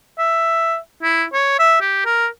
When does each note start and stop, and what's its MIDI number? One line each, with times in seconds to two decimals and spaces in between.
0.19 0.77 76
1.03 1.24 64
1.33 1.57 73
1.59 1.77 76
1.81 2.03 67
2.06 2.27 70